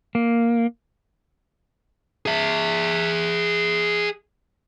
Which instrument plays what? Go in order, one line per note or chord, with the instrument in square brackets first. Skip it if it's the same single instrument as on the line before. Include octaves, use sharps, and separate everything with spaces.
[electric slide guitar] A#3
[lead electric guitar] G#4 E5